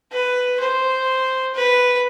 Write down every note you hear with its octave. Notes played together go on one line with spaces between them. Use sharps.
B4
C5
B4